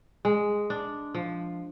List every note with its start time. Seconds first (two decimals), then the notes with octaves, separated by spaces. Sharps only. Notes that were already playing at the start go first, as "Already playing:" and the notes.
0.25 G#3
0.70 D4
1.15 F3